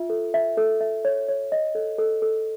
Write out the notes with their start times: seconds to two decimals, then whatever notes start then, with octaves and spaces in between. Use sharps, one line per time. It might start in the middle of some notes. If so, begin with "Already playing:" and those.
Already playing: F4 E5
0.10 A4
0.34 E5
0.57 A4
0.81 E5
1.05 C#5
1.28 C#5
1.52 D#5
1.75 A4
1.99 A4
2.22 A4